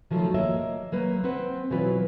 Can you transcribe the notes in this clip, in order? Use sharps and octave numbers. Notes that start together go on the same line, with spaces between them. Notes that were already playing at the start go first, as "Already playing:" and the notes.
D#3 F3 F#3 A3
A#3 C#5 D#5 E5
F#3 A#3 B4
C4 B4 F#5
B2 E3 F#3 B3 F4 B4